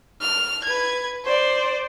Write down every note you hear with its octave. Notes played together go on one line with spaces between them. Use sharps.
F6
B4 G#6
C5 D5